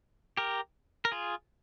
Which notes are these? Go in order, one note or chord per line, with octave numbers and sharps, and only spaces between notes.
G4 A#4
A#4
F4 G#4